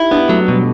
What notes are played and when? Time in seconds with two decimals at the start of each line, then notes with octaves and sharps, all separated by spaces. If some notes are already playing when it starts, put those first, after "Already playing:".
Already playing: D#4 E4 G4
0.11 B3 D4
0.29 F#3 A3
0.48 B2 G3